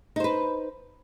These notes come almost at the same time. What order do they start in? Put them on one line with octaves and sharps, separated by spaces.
D#4 C5 B4